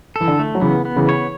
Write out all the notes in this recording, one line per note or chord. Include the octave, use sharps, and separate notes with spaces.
E3 A4
D3
A3
F#3
C#3 E3 B3
B3
C#3 E3
C#5